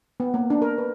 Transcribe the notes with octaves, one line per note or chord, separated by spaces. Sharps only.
B3
A#3
D4
A#4
B4